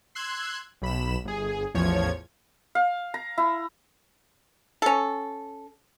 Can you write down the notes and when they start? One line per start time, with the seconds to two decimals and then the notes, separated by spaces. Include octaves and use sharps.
0.15 C6 E6 F#6 G#6
0.82 B1 B5 E7
1.24 G1 G#4
1.74 A1 E2 F3 C#5 G#6
2.75 F5
3.14 A#5
3.38 E4
4.82 C#4 A4